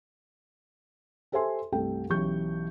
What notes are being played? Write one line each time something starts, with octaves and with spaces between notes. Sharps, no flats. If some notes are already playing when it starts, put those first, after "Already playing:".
G4 A4 C5 E5 G#5 C6
C2 G2 G3 A3 A4 G5
B1 E3 C#4 G4 C#6 G6